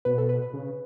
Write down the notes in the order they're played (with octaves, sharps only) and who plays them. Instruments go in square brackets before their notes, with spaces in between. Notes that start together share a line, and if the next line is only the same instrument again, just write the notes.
[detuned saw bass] B2 [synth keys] B4
[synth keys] A4
B4
B4
[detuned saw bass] C#3